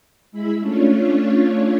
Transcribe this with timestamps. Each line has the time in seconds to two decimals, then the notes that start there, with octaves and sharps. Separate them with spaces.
0.32 G#3 E4 E5 B5
0.60 A3 C#4 D4 F4 C#5